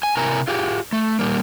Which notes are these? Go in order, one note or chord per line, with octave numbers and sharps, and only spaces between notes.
G#5
C3 E4 A#4 G#5 A#5
F4 G4 G#4
A3
A#2 G3 A#3